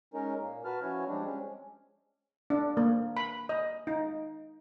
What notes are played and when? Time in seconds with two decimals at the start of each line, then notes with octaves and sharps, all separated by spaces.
0.14 G#3 C#4 D#4 A#4
0.41 A#2 A#3
0.64 F#4 B4 A5 F6
0.82 F3 C#4 E4 F#4 C#5
1.07 F3 G3 G#3 C4 D4
1.25 G#3 C4 C#4
2.50 D4
2.77 A#3
3.17 B5
3.49 D#5
3.87 D#4